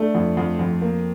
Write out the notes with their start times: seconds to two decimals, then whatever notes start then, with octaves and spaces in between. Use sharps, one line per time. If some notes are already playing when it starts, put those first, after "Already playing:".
Already playing: A3 D4
0.15 F2
0.37 F2
0.59 F2
0.82 A#3